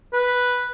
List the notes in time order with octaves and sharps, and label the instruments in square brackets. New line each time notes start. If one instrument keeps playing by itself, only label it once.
[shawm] B4